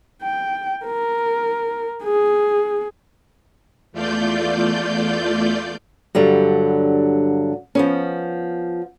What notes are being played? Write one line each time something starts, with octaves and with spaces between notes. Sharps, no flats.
G5
A#4
G#4
E2 A3 F4 D5 G6
G2 D3 F#3 G3
F3 B3 C#4